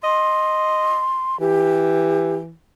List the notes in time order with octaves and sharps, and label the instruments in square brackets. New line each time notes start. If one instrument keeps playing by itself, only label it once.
[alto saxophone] D#5 [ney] C6
[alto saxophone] E3 [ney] G4